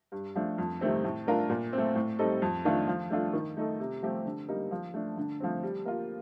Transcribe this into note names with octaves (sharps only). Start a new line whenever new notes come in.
G2
F3 A3 D4
F2
C3 D#3 A3 C4
A2
A3 D4 F4 A#4
A#2
A3 C4
A2
G3 C4 D#4 A4
F2
D#3 A3 D4 F4
F3
A3 D4 F4 A4
D#3
A3 D#4 A4
C3
F3 A3 C4 G4
D3
G3 A#3 D#4
F3
A3 D4
D3
F3 A3 C4
G3
A#3 F4